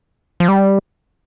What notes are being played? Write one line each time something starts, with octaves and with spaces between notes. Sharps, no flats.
F3
G3